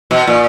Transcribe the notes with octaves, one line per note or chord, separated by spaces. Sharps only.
B2
A#2